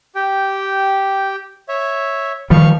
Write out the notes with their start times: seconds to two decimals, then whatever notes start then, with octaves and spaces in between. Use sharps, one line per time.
0.15 G4 G5
1.69 C#5 E5
2.50 D#3 F3 G3 F5 C#6